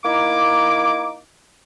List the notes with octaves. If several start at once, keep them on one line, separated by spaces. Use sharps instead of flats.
A#3 D#4 E4 D6